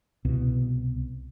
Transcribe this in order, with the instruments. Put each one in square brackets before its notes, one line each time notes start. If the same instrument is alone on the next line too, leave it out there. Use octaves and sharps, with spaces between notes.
[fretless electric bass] C2 B2